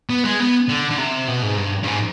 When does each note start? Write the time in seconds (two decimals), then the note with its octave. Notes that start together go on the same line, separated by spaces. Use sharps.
0.10 B3
0.25 G#3
0.40 B3
0.69 D3
0.91 D3
0.98 C3
1.28 B2
1.43 G#2
1.57 G2
1.83 G2
1.87 G#2